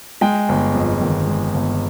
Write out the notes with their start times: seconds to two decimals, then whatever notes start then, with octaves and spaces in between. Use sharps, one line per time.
0.21 G#3 G5
0.49 G1
0.74 F2
1.01 D#3
1.27 G#3
1.54 G1